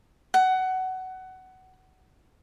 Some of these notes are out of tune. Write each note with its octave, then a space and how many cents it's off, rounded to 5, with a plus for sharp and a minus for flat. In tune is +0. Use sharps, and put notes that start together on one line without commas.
F#5 +20